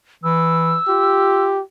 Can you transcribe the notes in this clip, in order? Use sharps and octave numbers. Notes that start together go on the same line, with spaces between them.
E3 E6
F4 G4